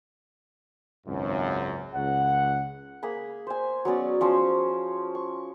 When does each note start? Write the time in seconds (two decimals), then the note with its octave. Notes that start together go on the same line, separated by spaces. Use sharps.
1.07 G#1 C#2 F#2
1.93 C#2 F#5
3.03 A#3 G#4 B5
3.47 C5 G#5
3.85 F#3 B3 C#4 D5
4.21 F3 C#4 C5
5.15 C#6